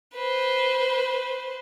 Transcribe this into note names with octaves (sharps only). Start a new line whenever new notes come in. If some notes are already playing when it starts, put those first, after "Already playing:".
B4 C5